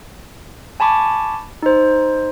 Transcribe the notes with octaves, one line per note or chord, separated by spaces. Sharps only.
G#5 A5 B5 C#6 D6
D#4 C5